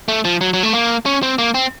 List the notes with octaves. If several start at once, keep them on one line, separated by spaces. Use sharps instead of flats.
A3
F3
F#3
F#3
A3
A#3
C#4
C4
A#3
C4